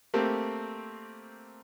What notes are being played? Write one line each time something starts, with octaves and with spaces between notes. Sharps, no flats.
A3 A#3 C4 G4